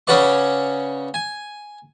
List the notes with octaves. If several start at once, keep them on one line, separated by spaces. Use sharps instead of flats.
C#3 C#4 F#4 B4 D5 C#6
G#5